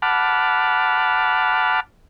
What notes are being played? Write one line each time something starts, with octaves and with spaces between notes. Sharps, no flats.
F#5 A5 B5 D6 F6